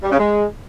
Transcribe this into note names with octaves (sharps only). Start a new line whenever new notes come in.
G3
C#3
G#3